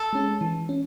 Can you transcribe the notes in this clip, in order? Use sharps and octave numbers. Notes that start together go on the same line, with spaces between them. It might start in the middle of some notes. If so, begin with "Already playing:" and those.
Already playing: A4
G#3 C#4
E3
C#4